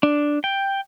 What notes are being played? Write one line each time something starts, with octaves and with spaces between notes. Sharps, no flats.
D4
G5